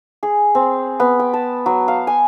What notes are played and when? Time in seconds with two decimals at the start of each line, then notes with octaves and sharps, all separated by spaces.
0.23 G#4
0.55 C4
1.00 B3
1.19 G5
1.33 A5
1.66 F#3
1.88 F5
2.07 G#5